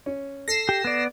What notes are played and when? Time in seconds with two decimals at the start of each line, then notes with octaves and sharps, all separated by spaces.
0.06 C#4
0.48 A4 A#6 C7 E7
0.69 G4
0.85 B3 D5